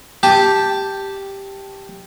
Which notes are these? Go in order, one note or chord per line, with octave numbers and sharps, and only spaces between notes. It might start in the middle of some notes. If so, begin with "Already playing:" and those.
G4 A5